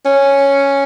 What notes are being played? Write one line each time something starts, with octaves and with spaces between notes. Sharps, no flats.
C#4